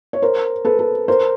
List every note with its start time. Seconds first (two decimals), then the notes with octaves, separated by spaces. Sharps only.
0.13 C#5
0.22 A#4 C5
0.65 A4 B4
0.79 A4
1.08 A#4 C5